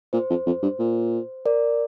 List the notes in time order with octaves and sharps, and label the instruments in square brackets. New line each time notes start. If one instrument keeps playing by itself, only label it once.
[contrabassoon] A#2 [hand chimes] C5
[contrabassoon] F2
F2
G2
A#2
[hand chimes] A#4 D5